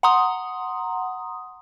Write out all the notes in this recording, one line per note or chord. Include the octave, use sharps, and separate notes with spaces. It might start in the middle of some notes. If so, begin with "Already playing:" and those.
F#5 A#5 C6 D#6